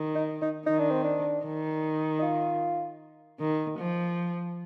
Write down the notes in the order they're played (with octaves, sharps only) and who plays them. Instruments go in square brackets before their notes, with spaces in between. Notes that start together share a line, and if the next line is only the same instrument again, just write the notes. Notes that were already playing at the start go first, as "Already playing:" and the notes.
Already playing: [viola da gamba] D#3
[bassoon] D#4
D#4
[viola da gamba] D#3 [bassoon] D#4
[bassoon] D4
C4
D4
[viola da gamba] D#3
[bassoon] D#4
F4
[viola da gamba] D#3
F3